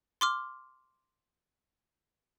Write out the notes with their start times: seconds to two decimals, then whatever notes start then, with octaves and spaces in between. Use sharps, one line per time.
0.21 C6 D6 F6